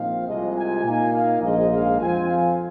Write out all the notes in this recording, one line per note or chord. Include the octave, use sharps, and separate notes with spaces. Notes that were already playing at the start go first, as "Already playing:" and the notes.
Already playing: A#1 A#2 F3 C4 D#4 F5
C2 C3 G#3 F4 D#5
G#5
A#2 A#3 D#4 G#5
F5
A#1 G#2 G#3 D#5
F5
F2 F3 C4 F4 G#5
F5